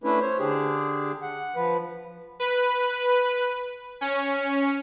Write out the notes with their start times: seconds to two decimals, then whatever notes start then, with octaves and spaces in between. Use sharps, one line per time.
0.04 A3 C#4 D4 E4 B4
0.21 C5 C#5
0.39 D3 D4 G4 G#4
1.22 F#5
1.56 F3 B4
2.40 B4
4.01 C#4